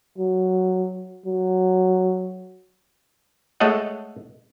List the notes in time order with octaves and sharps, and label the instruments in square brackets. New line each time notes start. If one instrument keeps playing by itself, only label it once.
[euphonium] F#3
F#3
[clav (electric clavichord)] G#3 A3 A4 C#5 D#5 F#5